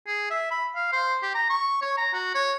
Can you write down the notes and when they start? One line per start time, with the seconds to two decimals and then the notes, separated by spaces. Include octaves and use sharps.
0.07 G#4
0.30 E5
0.51 B5
0.75 F5
0.92 C5
1.22 G4
1.34 A#5
1.50 C#6
1.82 C#5
1.97 A#5
2.13 F#4
2.35 C#5